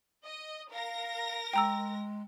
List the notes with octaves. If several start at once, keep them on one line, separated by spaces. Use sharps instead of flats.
D#5
A#4 F5 A#6
G#3 G5 A#5 E6